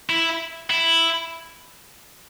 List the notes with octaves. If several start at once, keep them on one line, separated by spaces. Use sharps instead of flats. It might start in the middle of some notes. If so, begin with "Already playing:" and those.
E4
E4